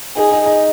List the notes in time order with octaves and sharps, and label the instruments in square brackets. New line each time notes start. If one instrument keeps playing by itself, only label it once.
[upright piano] D#4 [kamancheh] G#4
[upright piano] D#4
D#4